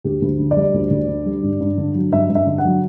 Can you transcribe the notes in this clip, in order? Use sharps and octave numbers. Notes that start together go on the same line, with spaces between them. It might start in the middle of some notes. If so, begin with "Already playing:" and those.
D2 G4
D2
D3
D5
G3
D2
D2
D3
G3
G2
G2
D3
F#3
G2 E5
G2
E5
D3
F#5
F#3